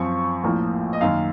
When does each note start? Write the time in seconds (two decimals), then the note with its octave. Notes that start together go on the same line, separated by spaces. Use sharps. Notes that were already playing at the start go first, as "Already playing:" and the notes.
Already playing: F#2 F3 C4 C#6
0.44 A#1 A2 F3 A#3
0.93 D#5
1.01 F#2 D#3 A#3 F5